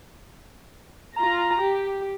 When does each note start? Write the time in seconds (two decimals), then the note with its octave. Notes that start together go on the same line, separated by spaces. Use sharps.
1.17 F4 A#5
1.60 G4